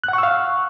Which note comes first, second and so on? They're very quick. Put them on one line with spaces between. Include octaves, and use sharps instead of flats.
F#6 F#5 C#6 E6 F5